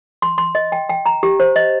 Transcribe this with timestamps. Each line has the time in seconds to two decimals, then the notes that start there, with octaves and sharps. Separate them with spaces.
0.22 C6
0.38 C6
0.55 D#5
0.72 G5
0.89 G5
1.06 A#5
1.23 G4
1.40 C5
1.56 D#5